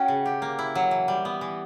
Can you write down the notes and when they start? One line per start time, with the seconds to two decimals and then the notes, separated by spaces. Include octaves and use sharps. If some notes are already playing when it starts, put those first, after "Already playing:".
Already playing: C#4 F#4 F#5 G5
0.08 C#3
0.26 G4
0.42 A#3
0.59 E4
0.75 F#3
0.91 E3
1.08 G3
1.25 B3
1.41 E3